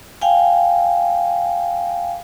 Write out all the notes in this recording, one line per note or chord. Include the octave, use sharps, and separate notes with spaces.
F5 G5 G#5